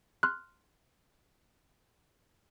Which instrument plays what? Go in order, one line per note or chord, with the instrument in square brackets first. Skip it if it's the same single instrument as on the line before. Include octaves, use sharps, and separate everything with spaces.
[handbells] C6 F6 F#6